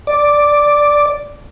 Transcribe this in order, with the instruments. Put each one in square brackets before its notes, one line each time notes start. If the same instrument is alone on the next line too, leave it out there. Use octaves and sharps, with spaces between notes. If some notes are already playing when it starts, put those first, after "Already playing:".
[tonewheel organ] D5